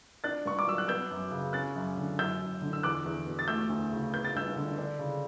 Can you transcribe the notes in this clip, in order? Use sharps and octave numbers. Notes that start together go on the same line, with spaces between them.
D4 F#6 A6
G2 C#6
D6
F#3 E6
F#6
B3 E6 G6
F#2
C#3
C#4 F#6 A6
F#2
D3
F#2 E6 G6
F#2
D3
E6
E2 D6 F#6
E2
B2
A6
A3 E6 G6
D2
C#3
B3 G6
A6
G2 E6 G6
D3
D4
C#3